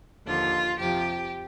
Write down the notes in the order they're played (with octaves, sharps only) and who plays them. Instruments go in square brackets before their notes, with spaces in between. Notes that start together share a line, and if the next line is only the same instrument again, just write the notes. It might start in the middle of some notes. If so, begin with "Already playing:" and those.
[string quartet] D#2 D3 F3 F4
F2 C3 F3 G4